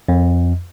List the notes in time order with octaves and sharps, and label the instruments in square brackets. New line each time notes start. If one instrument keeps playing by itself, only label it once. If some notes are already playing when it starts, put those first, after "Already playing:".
[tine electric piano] F2